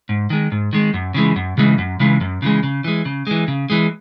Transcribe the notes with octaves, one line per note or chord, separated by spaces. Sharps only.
G#2
D#3 G#3
G#2
D#3 G#3
F#2
C#3 E3 G#3
F#2
C#3 E3 G#3
F#2
C#3 E3 G#3
F#2
C#3 E3 G#3
C#3
E3 G#3
C#3
E3 G#3
C#3
E3 G#3